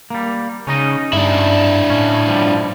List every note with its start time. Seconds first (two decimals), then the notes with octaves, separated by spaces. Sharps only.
0.10 G3 A#3
0.67 C#3 C#4 D#4 D#5
1.13 G2 D4 E4
1.90 A2 C#4
2.27 G2 F3 G3